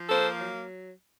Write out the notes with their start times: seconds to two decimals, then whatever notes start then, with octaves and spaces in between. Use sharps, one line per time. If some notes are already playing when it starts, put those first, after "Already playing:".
Already playing: F3
0.09 A#3 A4 C5
0.40 F#3